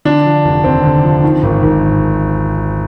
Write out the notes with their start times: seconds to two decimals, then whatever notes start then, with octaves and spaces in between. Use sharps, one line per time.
0.05 D3 D4
0.25 F3
0.45 F1
0.64 D#2 C4
0.84 D3
1.04 F3
1.23 D#3
1.43 G#1
1.63 G#1